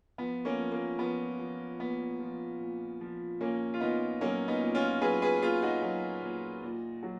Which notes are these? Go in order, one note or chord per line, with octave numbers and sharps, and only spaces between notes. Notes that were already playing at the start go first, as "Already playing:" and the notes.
F3 B3
A#3 C#4
F3
A#3
F3 B3
F3
A#2 B3
F3
A#2
F3
A#2 A#3 C#4
F4
A#2 B3 D#4
F#3 A#3 C#4
B3 D#4
A#2
C#4 F4
F#3 G#4 B4
G#4 B4
A#2 F4 G#4
D#4 F#4
F#3
A#2
A#2
F#3